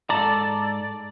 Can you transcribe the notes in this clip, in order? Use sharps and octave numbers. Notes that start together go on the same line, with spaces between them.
G#2 A4 D5 A5 A#5